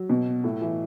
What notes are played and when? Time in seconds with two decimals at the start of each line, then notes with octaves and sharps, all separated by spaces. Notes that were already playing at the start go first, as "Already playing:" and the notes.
Already playing: F#3
0.10 B2
0.44 A2
0.61 E3